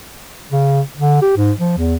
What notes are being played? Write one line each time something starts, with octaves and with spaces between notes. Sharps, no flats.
C#3
D3
G4
G#2
F3
E2